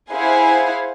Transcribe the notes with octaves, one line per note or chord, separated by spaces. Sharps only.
E4 G#4 C5 F5 F#5 G#5